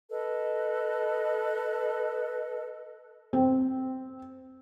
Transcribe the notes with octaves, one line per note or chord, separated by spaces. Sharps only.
A4 B4 D#5
C4